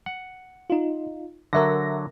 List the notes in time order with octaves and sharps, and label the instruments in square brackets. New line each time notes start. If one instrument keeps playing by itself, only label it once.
[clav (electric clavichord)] F#5
[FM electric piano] D#4 F4
[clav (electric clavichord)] D3 F#3 [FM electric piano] A#4 E5 A#6